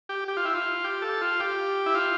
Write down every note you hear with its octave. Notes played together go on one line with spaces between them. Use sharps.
G4
G4
F4
E4
F4
G4
A4
F4
G4
E4
F4